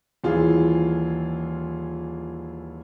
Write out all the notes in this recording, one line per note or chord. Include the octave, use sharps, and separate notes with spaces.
D#1 E3 F4 G#4